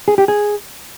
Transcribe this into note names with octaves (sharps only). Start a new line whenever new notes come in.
G#4
G4
G#4